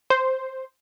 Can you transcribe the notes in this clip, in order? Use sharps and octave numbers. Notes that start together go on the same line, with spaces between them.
C5